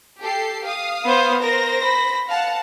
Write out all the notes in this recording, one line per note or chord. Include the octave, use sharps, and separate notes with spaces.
G4 A4 C7
F5 D#6
B3 C5
A#4 C5 A#6
B5
F5 F#5 A5